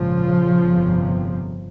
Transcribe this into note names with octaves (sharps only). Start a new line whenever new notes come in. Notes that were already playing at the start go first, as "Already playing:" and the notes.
Already playing: A#1 G#2 C#3 F3
G1 F2 C3